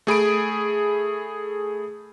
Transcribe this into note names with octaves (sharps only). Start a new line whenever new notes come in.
A3 G#4 B5 D7